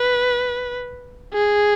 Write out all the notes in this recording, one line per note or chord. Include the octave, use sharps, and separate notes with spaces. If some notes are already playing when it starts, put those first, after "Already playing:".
Already playing: B4
G#4